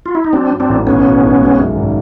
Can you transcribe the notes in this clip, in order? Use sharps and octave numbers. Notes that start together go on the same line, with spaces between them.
F4
E4
D#4
F#3 C4 D4
G2
C4 D4
A1
B1 B3 C#4
B2
B1
G#3
F#2
G#1